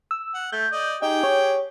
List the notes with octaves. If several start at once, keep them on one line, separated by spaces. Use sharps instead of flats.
E6
F#5
A3 G6
D5 D#5
D#4 G4 G#4 G5
C#5